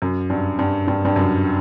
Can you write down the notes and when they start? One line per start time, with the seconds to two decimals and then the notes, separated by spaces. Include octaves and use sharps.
0.02 F#2
0.30 G2
0.59 G2
0.88 G2
1.05 G2
1.16 F#2